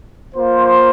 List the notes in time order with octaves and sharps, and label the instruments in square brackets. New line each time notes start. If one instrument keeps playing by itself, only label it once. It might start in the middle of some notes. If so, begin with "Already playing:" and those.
[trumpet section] A#3 F4 C5